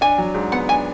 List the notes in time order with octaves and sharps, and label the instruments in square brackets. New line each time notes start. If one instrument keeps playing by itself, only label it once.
[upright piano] D4 [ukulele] G#5
[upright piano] F#3
G#2
[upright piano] B3 [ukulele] F#5
[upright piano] D4 [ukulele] G#5